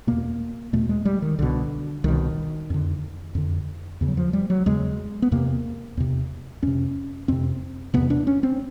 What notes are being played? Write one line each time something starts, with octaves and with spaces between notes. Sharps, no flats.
E2 B2 A#3
E2 B2 A3
G#3
G3
D#3
C2 B2 D3
C2 B2 D#3
F2 D3
F2 D3
E2 C#3
F#3
F3
G3
F#3
E2 C#3 G#3
B3
E2 C3 A#3
E2 C3
F2 C3 C#4
F2 C3 C4
E2 C3 B3
D4
C#4
C4